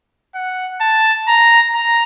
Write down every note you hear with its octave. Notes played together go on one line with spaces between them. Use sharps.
F#5
A5
A#5
A#5